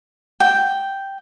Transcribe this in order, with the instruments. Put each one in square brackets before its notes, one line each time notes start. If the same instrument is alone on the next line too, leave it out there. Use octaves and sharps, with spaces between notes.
[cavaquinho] G5